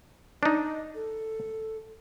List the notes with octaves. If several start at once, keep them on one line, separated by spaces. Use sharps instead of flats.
D4 D#4 D#5
A4